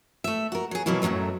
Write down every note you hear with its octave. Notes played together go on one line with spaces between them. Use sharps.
A3 E5
F#4 A#4
F#3 G#4
B2 E3 F#3 A#3 E4
F#2 A2 D3 F#3 A3